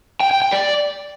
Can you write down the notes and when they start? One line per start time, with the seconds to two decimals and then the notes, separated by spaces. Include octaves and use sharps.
0.20 G5
0.31 G5
0.42 G5
0.52 D5